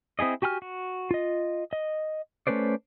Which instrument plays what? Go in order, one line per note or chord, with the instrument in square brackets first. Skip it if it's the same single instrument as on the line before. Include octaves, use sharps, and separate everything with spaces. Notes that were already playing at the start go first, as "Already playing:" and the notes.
[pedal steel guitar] C4 E4 G#4 D#5
F#4 G4 G#5 B5 F6
F#4
F4 D#5
D#5
A3 C#4 B4 C5 D5